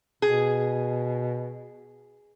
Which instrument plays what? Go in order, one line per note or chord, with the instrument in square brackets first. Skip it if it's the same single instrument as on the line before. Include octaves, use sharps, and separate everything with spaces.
[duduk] B2 [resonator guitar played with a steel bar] G#4